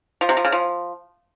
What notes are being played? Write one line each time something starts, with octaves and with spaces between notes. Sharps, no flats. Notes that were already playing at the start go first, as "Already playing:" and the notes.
F3
C3
F3
C#3
F3